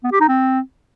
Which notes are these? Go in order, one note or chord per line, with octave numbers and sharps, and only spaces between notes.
B3
G4
D#4
C4